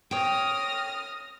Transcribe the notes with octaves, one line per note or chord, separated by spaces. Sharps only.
C#5 G5 D#6 F6 A#6